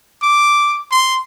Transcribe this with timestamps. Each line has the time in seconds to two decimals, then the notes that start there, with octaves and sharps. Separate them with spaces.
0.22 D6
0.92 C6